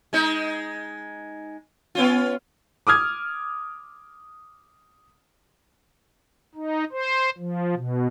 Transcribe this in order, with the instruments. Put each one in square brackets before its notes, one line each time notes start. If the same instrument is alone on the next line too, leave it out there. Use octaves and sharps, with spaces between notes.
[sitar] G#3 D#4
B3 C#4 F4
[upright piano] D6 D#6 F6 G#6
[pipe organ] D#4
C5
F3
B2